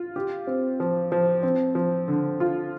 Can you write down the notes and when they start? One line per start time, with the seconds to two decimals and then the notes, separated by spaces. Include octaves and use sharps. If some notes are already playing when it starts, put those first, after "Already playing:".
Already playing: F4
0.16 G4
0.47 C4
0.80 F3
1.12 F3
1.43 C4
1.75 F3
2.08 D3
2.40 F4